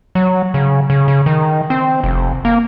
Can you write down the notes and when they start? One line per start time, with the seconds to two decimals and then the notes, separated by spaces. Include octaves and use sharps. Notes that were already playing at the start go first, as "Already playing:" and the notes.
0.15 F#3
0.54 C#3
0.90 C#3
1.08 C#3
1.26 D#3
1.70 C4
2.04 F1
2.45 A#3